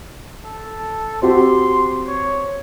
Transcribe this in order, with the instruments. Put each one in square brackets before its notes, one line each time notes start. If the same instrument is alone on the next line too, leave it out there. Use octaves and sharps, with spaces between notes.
[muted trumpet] A4
[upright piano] C4 F#4 G4 [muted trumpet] C6
[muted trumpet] C#5